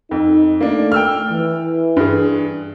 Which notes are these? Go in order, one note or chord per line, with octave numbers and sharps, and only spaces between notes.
F2 D#4
A3 A#3 D4
G5 E6 F6
E3
G2 G#4